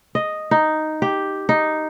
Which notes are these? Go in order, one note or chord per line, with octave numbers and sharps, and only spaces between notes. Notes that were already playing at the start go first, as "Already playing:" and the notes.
D#5
D#4
G4
D#4